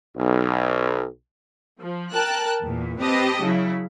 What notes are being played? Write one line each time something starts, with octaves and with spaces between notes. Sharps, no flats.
B1
F3
A#4 G5 A5 F#6
E2 A#2
C4 G4 B4 D#5 A5
C#3 F#3 E4